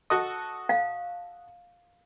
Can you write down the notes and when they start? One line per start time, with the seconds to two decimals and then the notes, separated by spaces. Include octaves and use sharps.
0.10 F#4 A4 D#5
0.69 F5